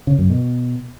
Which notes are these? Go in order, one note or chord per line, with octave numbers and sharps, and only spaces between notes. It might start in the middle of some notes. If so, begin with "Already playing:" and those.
C#3
F#2
B2